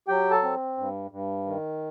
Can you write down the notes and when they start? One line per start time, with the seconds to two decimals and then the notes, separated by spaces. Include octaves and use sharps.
0.08 F#3 G4 G5
0.31 A4 A5
0.43 C4
0.77 G2
1.11 G2
1.46 D#3